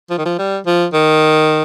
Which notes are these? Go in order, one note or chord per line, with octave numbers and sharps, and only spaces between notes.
F3
D#3
F3
G3
F3
D#3